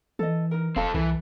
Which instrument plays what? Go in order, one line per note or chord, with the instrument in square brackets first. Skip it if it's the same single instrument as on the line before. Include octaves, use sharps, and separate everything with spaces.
[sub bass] E3 [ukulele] A4 D#5
[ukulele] D#4 A#4
[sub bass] D#1 [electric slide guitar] C4 A4 [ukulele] F5
[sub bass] C2 [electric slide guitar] E3 [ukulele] A4